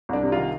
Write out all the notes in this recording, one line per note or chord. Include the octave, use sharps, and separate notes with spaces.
C2 D4
C3
D#3 F4